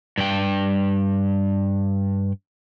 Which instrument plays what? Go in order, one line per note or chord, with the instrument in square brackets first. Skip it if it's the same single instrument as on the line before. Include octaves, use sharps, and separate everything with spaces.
[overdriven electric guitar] G2 G5